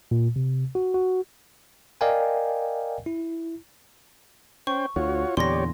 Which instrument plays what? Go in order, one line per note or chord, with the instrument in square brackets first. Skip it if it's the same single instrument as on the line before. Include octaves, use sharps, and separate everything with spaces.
[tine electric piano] A#2
C3
F#4
F#4
A#4 D5 D#5 F5 G5 G#5
E4
[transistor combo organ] C#4 C5 G5 [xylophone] C#6
[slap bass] D2 [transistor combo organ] F4 F#4 C#5
[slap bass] E2 A#2 D3 [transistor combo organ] G4 C#5 D5 [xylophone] C6 A#6